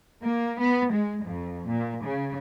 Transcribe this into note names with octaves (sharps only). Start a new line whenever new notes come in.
A#3
B3
G#3
F2
A#2
C#3